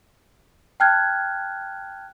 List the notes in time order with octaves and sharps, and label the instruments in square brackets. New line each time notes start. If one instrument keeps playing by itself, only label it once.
[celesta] G5 A5 F6 F#6 G#6